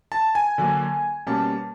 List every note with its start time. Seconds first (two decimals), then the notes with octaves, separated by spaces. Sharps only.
0.12 A5
0.35 G#5
0.58 D3 F#3 A#3
1.27 B2 G3 A#3 C#4 A5